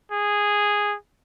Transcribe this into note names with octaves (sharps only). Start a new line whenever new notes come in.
G#4